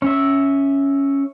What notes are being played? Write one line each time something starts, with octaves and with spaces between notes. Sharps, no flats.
C#4 E5